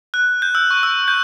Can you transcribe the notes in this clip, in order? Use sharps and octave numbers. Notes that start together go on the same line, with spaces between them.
F#6
G6
E6
C#6
E6
G6